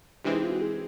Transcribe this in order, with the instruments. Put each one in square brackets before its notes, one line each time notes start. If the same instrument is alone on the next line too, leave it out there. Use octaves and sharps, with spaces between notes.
[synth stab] C3 E3 G#3 C4 [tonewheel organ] D4
[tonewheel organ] D#4
F4
F#4
G#4